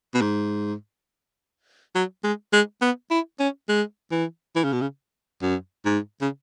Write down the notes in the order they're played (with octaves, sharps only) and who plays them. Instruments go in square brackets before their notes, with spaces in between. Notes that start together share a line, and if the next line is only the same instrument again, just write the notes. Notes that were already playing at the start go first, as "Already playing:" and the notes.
[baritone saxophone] B2
G#2
F#3
G#3
G#3
B3
E4
C#4
G#3
E3
E3
C#3
B2
C#3
F#2
G#2
C#3